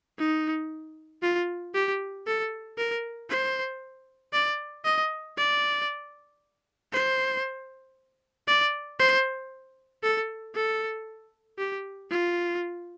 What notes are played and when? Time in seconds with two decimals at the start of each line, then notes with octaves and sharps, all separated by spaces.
0.19 D#4
1.22 F4
1.74 G4
2.27 A4
2.78 A#4
3.30 C5
4.33 D5
4.85 D#5
5.38 D5
6.93 C5
8.48 D5
8.99 C5
10.03 A4
10.55 A4
11.59 G4
12.11 F4